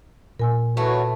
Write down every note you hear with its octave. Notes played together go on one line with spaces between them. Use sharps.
A#2 A#4 G#5 E6
A3 E4 F#4 A4 B4 C#5 F#5